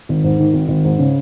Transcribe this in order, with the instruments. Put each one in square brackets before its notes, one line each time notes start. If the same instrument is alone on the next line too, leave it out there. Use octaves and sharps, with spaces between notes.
[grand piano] G#1
G#2
D#3
G#1
G#1
G#2
C#3